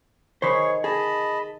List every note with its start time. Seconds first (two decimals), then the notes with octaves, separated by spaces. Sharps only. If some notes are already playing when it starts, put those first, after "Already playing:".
0.42 D#3 G#4 C5 C#5 B5 C#6
0.84 G#4 D#5 A5 B5